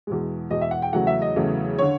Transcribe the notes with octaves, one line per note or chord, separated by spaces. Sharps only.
E2 B2 G#3
E2 B2 G#3 D#5
E5
F#5
G5
E2 C#3 F#3 A3 F#5
E5
D#5
E2 C#3 F#3 A3
D3 C#5